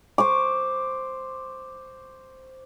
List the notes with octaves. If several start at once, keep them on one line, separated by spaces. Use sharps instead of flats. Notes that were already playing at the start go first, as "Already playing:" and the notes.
C5 C#6 D6